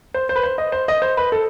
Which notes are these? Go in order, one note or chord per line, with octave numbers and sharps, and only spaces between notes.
C5
C5
B4
C5
D#5
C5
D#5
C5
B4
A4